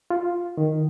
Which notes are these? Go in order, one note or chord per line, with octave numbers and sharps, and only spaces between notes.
F4
D#3